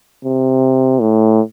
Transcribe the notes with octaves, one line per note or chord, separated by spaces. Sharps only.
C3
A2